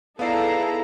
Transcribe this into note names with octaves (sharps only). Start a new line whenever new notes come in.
B3 D#4 E4 G#4 A4 D5 F5 A#5